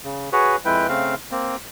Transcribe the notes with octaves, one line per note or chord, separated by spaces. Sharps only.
C#3
F#4 G#4 B4 C#5
F2 G#3 E4 B4 G5
C#3 A3 C4 F5
A#3 C4